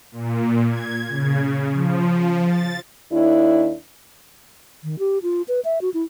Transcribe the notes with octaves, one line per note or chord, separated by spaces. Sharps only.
A#2
G#6
C#3
F3
A6
D#2 D4 E4
D#3
G4
F4
B4
E5
F#4
E4